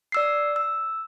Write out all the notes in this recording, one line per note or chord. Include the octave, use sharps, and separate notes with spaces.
D5 E6 C7
E6